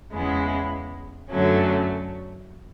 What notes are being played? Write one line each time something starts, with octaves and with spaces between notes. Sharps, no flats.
E2 C#3 G#3 B3 E4
F#2 D3 F#3 A3 C#4